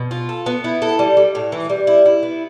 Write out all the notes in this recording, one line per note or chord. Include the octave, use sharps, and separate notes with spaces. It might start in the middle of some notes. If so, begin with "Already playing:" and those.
Already playing: B2
F4
A4
B3
E4
A4
G3
G3
A2
E3
G3
E4
E4
B3